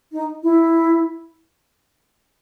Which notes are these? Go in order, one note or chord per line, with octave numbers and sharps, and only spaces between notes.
D#4
E4